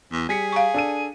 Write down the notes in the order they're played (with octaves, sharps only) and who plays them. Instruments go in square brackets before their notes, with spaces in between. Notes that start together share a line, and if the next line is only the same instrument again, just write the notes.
[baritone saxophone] E2
[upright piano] G3 B6 C#7 [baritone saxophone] G#4
[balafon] F5 A#5 C#6
[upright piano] D4 A4 D#7